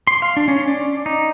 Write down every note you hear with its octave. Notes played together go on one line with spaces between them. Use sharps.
C6
F5
D4
C#4
D5
D#4